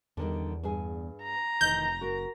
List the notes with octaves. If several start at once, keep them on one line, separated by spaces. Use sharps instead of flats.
E2 D3 D#3 G3
G2 G#4
A#5
F1 D#3 E3 G6
F#1 F#4 A#4